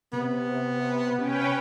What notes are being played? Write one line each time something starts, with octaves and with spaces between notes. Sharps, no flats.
C3 B3
C3 C#4 B4 G5